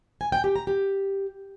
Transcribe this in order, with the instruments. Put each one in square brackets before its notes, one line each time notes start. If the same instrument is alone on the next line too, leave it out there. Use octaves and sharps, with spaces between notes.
[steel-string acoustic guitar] G#5
G5
G4
A#5
G4